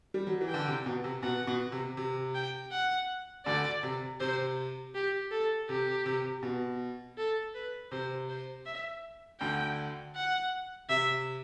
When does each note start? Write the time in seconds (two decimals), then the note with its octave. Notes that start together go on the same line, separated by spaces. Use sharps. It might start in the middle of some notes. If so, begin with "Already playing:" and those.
0.14 G3
0.27 F#3
0.41 E3
0.48 G5
0.54 D3
0.67 C3
0.86 B2
1.04 C3
1.22 B2 F#5
1.47 B2
1.72 C3
1.97 C3
2.35 G5
2.72 F#5
3.46 D2 D3 D5
3.83 C3
4.20 C3 C5
4.95 G4
5.31 A4
5.69 C3 G4
6.06 C3
6.43 B2
7.17 A4
7.55 B4
7.91 C3 C5
8.29 C5
8.66 E5
9.40 D2 D3 G5
10.15 F#5
10.89 C3 E5